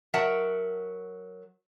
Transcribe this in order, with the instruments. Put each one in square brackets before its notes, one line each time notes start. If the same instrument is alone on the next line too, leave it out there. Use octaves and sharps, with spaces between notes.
[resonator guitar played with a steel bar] F#3 A#4 E5 F#5 A5